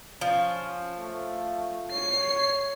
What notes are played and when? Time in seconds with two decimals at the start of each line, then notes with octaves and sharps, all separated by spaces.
0.21 F3 C#4
0.98 A3
1.92 C#5 C7